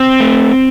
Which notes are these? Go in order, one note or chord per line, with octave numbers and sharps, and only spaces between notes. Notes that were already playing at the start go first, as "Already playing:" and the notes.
Already playing: C4
A3